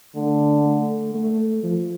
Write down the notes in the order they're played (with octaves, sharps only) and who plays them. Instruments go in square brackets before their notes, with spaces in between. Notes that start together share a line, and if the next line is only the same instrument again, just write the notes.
[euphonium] D3 [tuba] A3
[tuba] A3
A3
F3